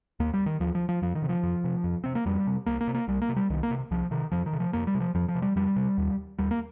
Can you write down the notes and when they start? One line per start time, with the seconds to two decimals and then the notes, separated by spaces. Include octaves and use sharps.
0.20 D#2 A#3
0.34 G3
0.46 D#3
0.60 D#2 F3
0.75 F3
0.89 F3
1.02 F2 F3
1.15 D#3
1.22 C3
1.29 F3
1.43 F2
1.64 C3
1.84 F2
2.04 C3 C4
2.15 A#3
2.26 F2 G3
2.47 C3
2.66 C2 A#3
2.81 A#3
2.87 C3
2.94 A#3
3.08 C2 G3
3.22 A#3
3.29 C3
3.36 G3
3.50 C2 D#3
3.63 A#3
3.71 C3
3.91 C2 F3
4.11 C3 D#3
4.32 F2 F3
4.46 D#3
4.53 C3
4.60 F3
4.73 F2 A#3
4.87 G3
4.95 C3
5.00 F3
5.14 F2 F3
5.28 F3
5.35 C3
5.42 G3
5.56 F2 G3
5.76 C3
5.98 D#2
6.39 D#2 G3
6.51 A#3